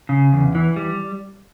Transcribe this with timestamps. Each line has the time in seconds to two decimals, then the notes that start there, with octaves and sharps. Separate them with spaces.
0.09 C#3
0.33 E2
0.55 E3
0.76 G3